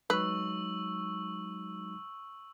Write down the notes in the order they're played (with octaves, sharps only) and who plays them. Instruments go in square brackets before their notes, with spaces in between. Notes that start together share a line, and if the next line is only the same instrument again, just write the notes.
[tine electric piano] F#3 G#3 D#4 [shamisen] B4 [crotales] C#6 E6 F#7